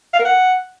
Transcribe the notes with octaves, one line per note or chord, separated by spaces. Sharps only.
F5
A#4
F#5